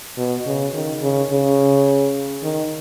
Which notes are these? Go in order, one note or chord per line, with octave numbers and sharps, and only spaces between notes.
B2
C#3
D#3
C#3
C#3
D#3